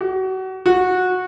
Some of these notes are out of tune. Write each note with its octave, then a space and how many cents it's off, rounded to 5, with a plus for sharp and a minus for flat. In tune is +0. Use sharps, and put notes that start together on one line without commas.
F#4 +30
F#4 -15